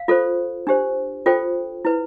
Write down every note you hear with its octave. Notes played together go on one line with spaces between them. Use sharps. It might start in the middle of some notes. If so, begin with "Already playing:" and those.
Already playing: F5
F4 A4 C5
D4 G4 C5
F4 A4 C5 G5
E4 B4